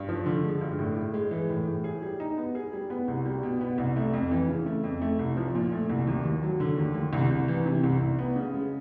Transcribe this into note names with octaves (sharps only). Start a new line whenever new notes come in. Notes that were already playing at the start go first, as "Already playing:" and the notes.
Already playing: G2
F3
D3
G#3
G2
A2
A2
G#3
E3
A2
A2
G#4
G3
D#4
B3
G#4
G3
B3
C2
G3
B2
B3
C2
A3
F2
E3
C#3
A3
F2
A3
C2
F3
A#2
A3
C2
D#2
D#2
F#3
D3
D#2
D#2
C2
C2
E3
C3
C2
C2
B3
C#3
G#3